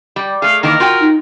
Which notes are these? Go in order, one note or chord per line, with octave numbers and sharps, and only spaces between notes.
G3
A3 G#4 F5
D#3 E3 A#3 A#4
F4 F#4 G5
D#4